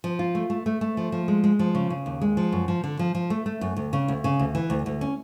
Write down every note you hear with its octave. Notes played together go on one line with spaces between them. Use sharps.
F3
F4
A3
A3
A3
A3
F3
F3
G#3
G#3
F3
C#3
C#3
D#2
G#3
F3
F#2
F3
D3
F3
F3
A3
A3
F#2
D2
C#3
D2
C#3
D2
E3
D2
D2
C#4